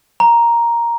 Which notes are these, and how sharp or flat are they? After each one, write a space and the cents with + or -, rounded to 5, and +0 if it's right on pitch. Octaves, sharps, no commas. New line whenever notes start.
A#5 +5